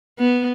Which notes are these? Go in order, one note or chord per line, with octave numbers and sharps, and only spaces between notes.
B3